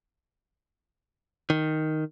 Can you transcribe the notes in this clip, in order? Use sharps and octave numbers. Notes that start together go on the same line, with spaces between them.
D#3